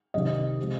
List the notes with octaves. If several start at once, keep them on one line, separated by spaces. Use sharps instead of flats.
C2 C3 D#3 G3 D#5
C3 F3 G#3